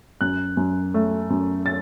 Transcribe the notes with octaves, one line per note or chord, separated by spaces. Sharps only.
F#2 F#6
F#2
A3
F#2
A6